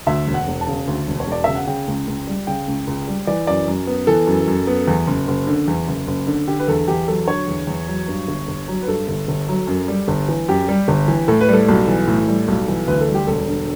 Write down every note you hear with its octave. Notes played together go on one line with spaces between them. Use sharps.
D2 E5
E1
F#5
E1
A5
C#3
D2
E1
C#5
E1 D5
C#3 E5
F#5
C#3 G5
C#2
C#2
G3
C#3 G5
C#2
C#2
G3
E3 D5
F#2 D5
F#2
B3
E3 A4
F#2
F#2
B3
E2
F#1
F#1
D3
E2
F#1
F#1
D3
D3 G4
B4
E2 A4
E2 G4
F#3 A4
D3 C#5
E2
E2
F#3
G2
G1
G1
F#3
B4
G2 A4
G1
G1
F#3
F#2
G3
G1
E3
F#2 G4
G3
G1
E3
A2 A4
B4
G3 A4
B1
E3
A2
G3
B1
E3
D2 B4
A4
G3
G4
E1 A4
D3